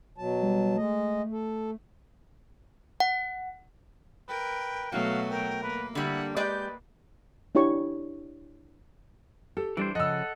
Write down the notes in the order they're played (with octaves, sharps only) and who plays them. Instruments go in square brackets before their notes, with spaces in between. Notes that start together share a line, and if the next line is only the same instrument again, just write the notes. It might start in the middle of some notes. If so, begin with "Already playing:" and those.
[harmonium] B2 F#3 A5
[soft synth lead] G3
[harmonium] G#3 D#5 [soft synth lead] A3
[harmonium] A4
[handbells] F#5
[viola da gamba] A#4 [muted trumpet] B4 [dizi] G5
[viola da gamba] B2 F#3 A3 [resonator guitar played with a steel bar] F#4 [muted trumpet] F5
[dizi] A#4 [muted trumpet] G5
[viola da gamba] A#3 [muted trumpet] B4
[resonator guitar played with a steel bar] D3 G3 [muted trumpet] E4 [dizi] F#5
[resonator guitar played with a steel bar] G#3 G4 D5 [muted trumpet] B4 [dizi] G6
[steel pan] D4 E4 G4 C#5 C#6
[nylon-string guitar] G4 [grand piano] A4
[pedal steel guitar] E3 D4 C5 [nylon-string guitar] G3
[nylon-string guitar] C#3 F3 [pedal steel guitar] A4 F#5 [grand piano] D#5 E6